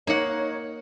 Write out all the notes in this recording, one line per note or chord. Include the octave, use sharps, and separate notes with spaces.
A#3 D#4 C#5 F#5